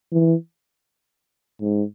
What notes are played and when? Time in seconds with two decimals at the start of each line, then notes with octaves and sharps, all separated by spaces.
0.12 E3
1.61 G#2